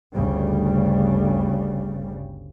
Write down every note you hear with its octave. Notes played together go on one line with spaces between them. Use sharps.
G1 D2 C#3 G3